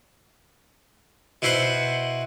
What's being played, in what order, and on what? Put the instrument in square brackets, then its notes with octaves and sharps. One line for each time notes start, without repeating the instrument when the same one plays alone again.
[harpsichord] B2 E4 C5 F#5